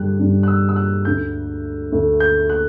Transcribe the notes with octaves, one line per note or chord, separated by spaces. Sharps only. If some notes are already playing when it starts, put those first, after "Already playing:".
Already playing: G2 D3 G3 D4 F#6
G2 D3 G3 D4
F#6
E6
E6
F#6
D2 D3 A3 G6
D2 D3 A3
G6
F#6